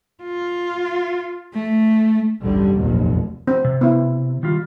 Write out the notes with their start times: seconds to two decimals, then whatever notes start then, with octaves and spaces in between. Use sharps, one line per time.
0.23 F4
1.54 A3
2.43 A1 D2 G2 D3 G3
2.75 F1 A#1 D#2 A#2 F#3
3.47 C4
3.64 C3
3.81 B3 E4
4.43 D#3 G3 F4